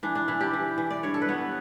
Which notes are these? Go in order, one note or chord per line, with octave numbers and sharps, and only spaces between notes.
E3 D4
D4
E3 E4
G4
E3
E3
D5
G2 C#5
A4
B4
B3 C#5